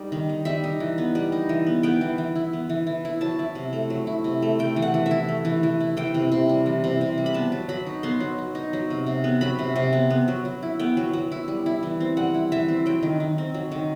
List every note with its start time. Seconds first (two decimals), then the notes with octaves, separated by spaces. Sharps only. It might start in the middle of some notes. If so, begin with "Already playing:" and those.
Already playing: G3 D#4
0.12 D#3
0.29 D#4
0.45 G3 E5
0.64 D#4
0.80 E3
0.98 B3
1.15 G3
1.32 D#4
1.49 E3
1.66 B3
1.83 B3 G5
2.01 E3
2.18 E3
2.36 E4
2.53 B3
2.69 E3
2.87 E3
3.05 E4
3.21 F#3 A5
3.39 E4
3.55 C3
3.73 A3
3.90 F#3
4.07 E4
4.24 C3
4.42 A3
4.59 A3 G5
4.76 E3
4.82 F#5
4.94 E3
5.06 E5
5.11 E4
5.29 A3
5.45 E3
5.63 E3
5.80 E4
5.97 E3 G5
6.14 C3
6.32 C3
6.49 G3
6.66 E3
6.84 C3
7.01 C3
7.18 G3
7.26 B5
7.34 B3 A5
7.52 F#3
7.69 F#3 B5
7.86 D#4
8.03 B3 C6
8.20 F#3
8.38 F#3
8.55 D#4
8.73 F#3
8.90 C3
9.06 C3
9.24 B3
9.41 F#3 B5
9.59 C3
9.76 C3
9.93 B3
10.10 B3
10.28 F#3
10.45 F#3
10.63 E4
10.79 B3 G5
10.97 F#3
11.13 F#3
11.32 E4
11.48 G3
11.66 E4
11.83 E3
12.00 C4
12.17 G3 F#5
12.34 E4
12.52 E3 E5
12.68 C4
12.86 F#3 G5
13.03 D#3
13.20 D#3
13.38 C4
13.54 F#3
13.72 D#3